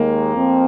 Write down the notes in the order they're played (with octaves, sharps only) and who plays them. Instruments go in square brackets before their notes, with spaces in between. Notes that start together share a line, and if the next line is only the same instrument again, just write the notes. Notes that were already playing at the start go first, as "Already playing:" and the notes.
Already playing: [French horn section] D#2 D#3 G#3 [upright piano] A#3
[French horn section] F2 F3 C4